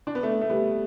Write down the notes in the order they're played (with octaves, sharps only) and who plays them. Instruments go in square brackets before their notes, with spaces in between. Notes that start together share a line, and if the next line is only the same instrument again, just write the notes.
[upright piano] D4
B3
A3
A3
G3 B3